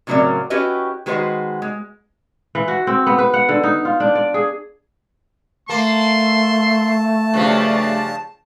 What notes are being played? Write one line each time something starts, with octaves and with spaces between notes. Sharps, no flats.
A2 C#3 F#3 A#3 C4 D5
C#4 E4 F#4 G4 B4 D#5
D#3 G#3 F#4 B4 C5 D#5
G#3
E3
F#4
C4
B3
B4
F#5
D3
D#4
F4
D4
D5
G#4
A3 A#3 A5 C6
G2 C#3 F3 D4